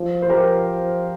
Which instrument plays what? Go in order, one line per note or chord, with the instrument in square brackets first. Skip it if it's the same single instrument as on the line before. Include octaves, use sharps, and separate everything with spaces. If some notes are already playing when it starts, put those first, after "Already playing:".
Already playing: [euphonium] F3
[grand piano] C5
[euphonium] F3 [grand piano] G4 A#4